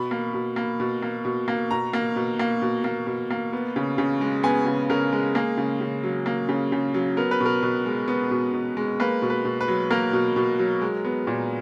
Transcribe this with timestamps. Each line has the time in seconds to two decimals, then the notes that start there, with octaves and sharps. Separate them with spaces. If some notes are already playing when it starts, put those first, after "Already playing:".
Already playing: B2 B5
0.11 A#3
0.34 B2
0.56 A#3
0.80 B2
1.02 A#3
1.25 B2
1.48 A#3
1.71 B2 A#5
1.93 A#3
2.16 B2
2.39 A#3
2.62 B2
2.84 A#3
3.07 B2
3.30 A#3
3.53 B3
3.76 C#3
3.98 C#3
4.21 G#3
4.43 B3 G#5
4.66 C#3
4.89 C#3 A#4
5.13 G#3
5.35 A#3 G#4
5.57 C#3
5.81 C#3
6.03 F#3
6.26 A#3
6.49 C#3
6.72 C#3
6.94 F#3
7.17 B3 A#4
7.31 B4
7.40 B2
7.45 A#4
7.63 B2
7.86 G#3
8.08 B3
8.31 B2
8.53 B2
8.77 G#3
9.00 A#3 B4
9.22 B2
9.30 B4
9.45 B2
9.61 B4
9.68 F#3
9.91 A#3 A#4
10.13 B2
10.36 B2
10.59 F#3
10.81 G#3
11.05 B3
11.27 A#2